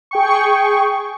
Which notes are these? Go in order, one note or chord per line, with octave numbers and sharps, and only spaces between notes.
G#4 G5 C#6